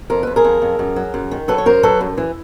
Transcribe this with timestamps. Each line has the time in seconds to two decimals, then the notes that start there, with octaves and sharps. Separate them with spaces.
0.10 F2 A#4
0.23 F2 B4
0.36 G#4 A#4
0.45 F2
0.62 F2
0.79 F#2
0.96 F#3
1.14 F#2
1.31 D#3
1.48 F#3 A4 B4
1.58 C#5
1.66 F#2 A#4 C5
1.83 F#3 A4 B4
2.01 F#2
2.18 E3